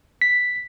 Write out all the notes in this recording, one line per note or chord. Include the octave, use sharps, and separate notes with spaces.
B6